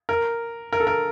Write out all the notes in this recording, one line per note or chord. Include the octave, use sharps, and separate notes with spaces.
A#4
A#4
A4
A#4